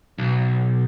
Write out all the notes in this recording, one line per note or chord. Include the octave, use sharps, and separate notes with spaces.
B1